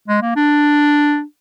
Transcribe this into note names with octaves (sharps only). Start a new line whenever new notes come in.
G#3
A#3
D4